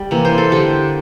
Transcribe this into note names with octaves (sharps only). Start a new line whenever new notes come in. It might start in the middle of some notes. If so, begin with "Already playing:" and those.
Already playing: G3
C3 E3 A#3
C5
A4
D3 G3 A#3 G4